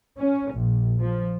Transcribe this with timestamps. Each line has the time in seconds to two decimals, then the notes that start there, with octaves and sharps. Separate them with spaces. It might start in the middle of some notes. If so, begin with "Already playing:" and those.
0.18 C#4
0.54 A#1
1.01 F3